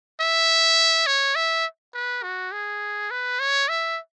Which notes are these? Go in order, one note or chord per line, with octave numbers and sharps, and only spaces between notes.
E5
C#5
E5
B4
F#4
G#4
B4
C#5
E5